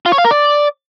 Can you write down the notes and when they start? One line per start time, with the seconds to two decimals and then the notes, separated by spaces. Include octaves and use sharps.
0.06 F4
0.12 C#5
0.18 F5
0.25 A#4
0.31 D5